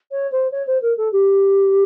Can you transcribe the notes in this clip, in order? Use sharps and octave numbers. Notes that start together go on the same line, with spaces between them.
C#5
C5
C#5
C5
A#4
A4
G4